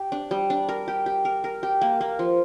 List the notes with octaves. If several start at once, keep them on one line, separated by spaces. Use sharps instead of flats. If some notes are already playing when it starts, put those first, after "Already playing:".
Already playing: G4
D4
G3
D4
A#4
G4
G4
A#4
A#4
G4
A#3
A#3
F3